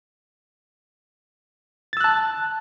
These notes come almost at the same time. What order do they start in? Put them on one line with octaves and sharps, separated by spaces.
A6 E6 F#6 A5